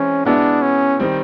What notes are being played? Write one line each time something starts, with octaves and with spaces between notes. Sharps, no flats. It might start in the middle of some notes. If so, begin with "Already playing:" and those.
Already playing: E3 G#3 C4 C#4
B2 G#3 B3 D4 E4
C#4
D#3 G3 C4